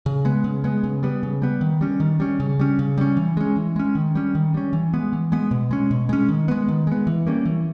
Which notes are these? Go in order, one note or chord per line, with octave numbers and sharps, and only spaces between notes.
C#3
G#3 B3
C#3
G#3 B3
C#3
G3 B3
C#3
G3 B3
D#3
G3 C#4
D#3
G3 C#4
C#3
G3 C#4
C#3
G3 C#4
E3
G#3 C#4
E3
G#3 C#4
D#3
G3 C#4
D#3
G3 C#4
E3
G#3 B3
E3
G#3 B3
B2
G#3 C#4
B2
G#3 C#4
D#3
G#3 B3
D#3
G#3 B3
E3
G3 A#3 C#4
E3